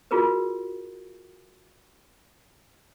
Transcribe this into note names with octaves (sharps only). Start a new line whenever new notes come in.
F4 F#4 G#4 A#4 B4